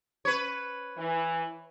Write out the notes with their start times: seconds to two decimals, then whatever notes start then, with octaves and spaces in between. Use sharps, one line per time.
0.25 B4 C#5
0.98 E3